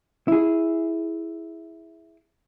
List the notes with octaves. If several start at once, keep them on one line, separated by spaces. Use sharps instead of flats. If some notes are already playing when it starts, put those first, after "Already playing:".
E4 G#4